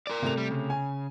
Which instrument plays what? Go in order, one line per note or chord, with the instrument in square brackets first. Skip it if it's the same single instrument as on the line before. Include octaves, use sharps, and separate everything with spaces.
[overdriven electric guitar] A#4 D5
[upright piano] C3 A3 F7
[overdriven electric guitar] G3
C#3
[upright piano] G#5